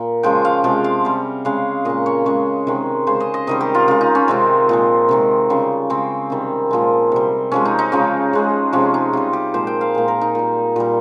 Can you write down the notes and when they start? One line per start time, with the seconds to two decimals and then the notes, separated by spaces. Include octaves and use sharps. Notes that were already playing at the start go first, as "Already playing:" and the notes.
Already playing: A#2
0.23 C#3 F3 G#3 G5
0.45 F5
0.64 C3 F3 G#3 G5
0.84 F5
1.05 C3 G3
1.45 C#3 G#3 F5
1.85 A#2 G#3 D#5
2.06 C#5
2.26 C#3 G#3 C#5
2.67 C3 D#3 G#3
3.07 C#3 G#3 C5
3.20 D#5
3.34 D#5
3.47 C3 D#3 G3 D#5
3.61 G4
3.75 F4
3.88 C#3 G#3 F4
4.01 D#4
4.15 C#4
4.28 C3 D#3 G#3 C4
4.69 A#2 F3 G#3
5.09 C3 D#3 G#3
5.50 C#3 G3
5.90 C#3 G#3 C4
6.30 C3 D#3 G3
6.71 A#2 F3 G#3
7.12 C3 G3
7.52 C3 F3 G#3 C#4
7.65 D#4
7.79 D#4
7.92 C#3 F3 G#3 C#4
8.33 C#3 G#3
8.73 C3 F3 G#3 C#4
8.94 D#4
9.13 C3 G3 F4
9.33 G4
9.54 A#2 F3 G#3 C5
9.67 G5
9.81 F5
9.95 A#2 G#3
10.08 A#4
10.21 D#4
10.35 A#2 G3
10.76 A#2 G3